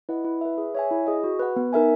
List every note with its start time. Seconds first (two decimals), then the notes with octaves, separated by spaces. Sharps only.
0.09 E4 B4 D#5 F#5
0.24 E4
0.41 B4 E5
0.58 G#4
0.75 C#5 E5 G#5
0.91 E4
1.07 G#4 D#5
1.24 F#4
1.39 B4 F#5
1.56 B3
1.73 D#4 A#4 E5 G#5